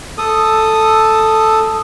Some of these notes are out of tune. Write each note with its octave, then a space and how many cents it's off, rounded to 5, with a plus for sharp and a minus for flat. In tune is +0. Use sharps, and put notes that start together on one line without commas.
A4 +0 D#6 -5